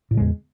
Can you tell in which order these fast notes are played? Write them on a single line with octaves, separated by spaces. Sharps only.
A2 C#3 G#3 E2